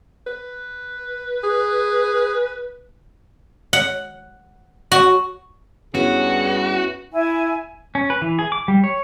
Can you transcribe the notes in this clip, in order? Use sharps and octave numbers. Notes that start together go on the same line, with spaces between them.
B4
G#4
F#5
F#4
G2 B3 C#4 E4 F#4 G#4
E4 G#5
C#4
B4
E3
G#4
D6
G3
C#5